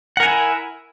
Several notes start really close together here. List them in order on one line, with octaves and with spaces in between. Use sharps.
F#5 A#4 G#5 E4